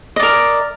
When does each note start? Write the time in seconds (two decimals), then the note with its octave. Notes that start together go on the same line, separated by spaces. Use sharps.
0.16 D#5
0.19 D5
0.23 A#4